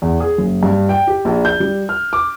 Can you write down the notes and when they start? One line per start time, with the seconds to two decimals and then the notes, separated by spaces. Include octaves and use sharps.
0.02 E2
0.20 G#4
0.38 F#1
0.63 G2
0.89 G5
1.07 G4
1.25 A#1
1.45 G6
1.60 G3
1.89 F6
2.13 D6